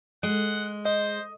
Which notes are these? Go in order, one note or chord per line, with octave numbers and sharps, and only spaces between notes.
G#3 F#5
C5 D#5